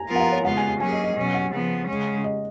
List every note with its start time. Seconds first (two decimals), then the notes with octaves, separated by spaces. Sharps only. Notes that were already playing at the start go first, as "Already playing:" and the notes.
Already playing: G#5 A#5
0.08 F3 B3 F4 A#4
0.16 F#5
0.20 F5
0.32 C#5
0.45 C#3 G#3 B3 F4 F#5
0.57 G#5
0.69 G#5
0.80 F#3 A#3 C#4 G#4 G#5
0.92 D#5
1.04 D#5
1.17 B2 F#3 C#4
1.34 F#5
1.52 C#3 F3 B3
1.88 C#3 G#3 C#4
2.24 D#5